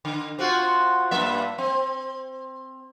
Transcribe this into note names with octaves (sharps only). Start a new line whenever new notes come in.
D3
C4 F4 F#4
G2 A#3 E5
C4